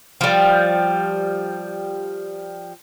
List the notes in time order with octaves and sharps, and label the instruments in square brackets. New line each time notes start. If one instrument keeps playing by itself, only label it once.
[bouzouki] F3 G3